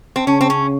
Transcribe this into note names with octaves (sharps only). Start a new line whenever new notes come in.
C4
C#3 C#4
C4
C#4